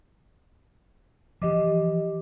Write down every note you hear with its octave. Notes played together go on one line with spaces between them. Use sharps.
E3 F3 G4 D#5 D6